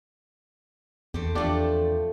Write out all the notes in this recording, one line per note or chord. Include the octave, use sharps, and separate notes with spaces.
E2 A3 C4 G4
E2 F3 A3 D4 G4 A4 D5